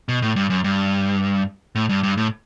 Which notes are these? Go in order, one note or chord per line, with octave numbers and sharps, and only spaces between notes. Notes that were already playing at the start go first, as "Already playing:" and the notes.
B2
A2
G2
F#2
G2
A2
G2
G2
A2